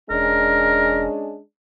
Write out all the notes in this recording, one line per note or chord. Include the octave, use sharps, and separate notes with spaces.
E1 G#3 C#4 D4 A#4